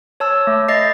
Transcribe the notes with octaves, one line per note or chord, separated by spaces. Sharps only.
C#5 A5 E6
A3
A3 D#5 A6 C7